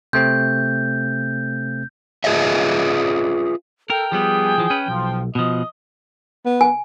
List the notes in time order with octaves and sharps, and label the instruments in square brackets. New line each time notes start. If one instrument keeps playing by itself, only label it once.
[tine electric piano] C3 A3 C4 [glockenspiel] G6
[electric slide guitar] F4 G#4 B4 D#5 E5
[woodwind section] A4 [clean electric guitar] A#4 [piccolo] G5
[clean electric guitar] F3 G3 B3 [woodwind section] G#4
[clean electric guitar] E3 F3
C#4 B4
[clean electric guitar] B1 [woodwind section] F3
[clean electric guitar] B2 F3 [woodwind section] D#5
[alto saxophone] B3
[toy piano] G#5